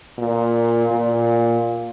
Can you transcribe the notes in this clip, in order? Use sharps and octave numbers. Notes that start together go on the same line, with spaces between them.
A#2
A#2